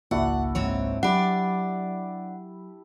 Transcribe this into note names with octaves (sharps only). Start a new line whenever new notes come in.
G#1 C#2 A#3 D4 E4 F#4 F#5
G#2 C4 C#5
F#3 D4 G4 D5 F#5 B5